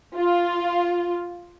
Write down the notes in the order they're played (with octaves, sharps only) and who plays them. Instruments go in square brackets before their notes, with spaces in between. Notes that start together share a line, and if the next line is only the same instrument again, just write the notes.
[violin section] F4